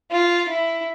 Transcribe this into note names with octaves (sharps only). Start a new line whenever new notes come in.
F4
E4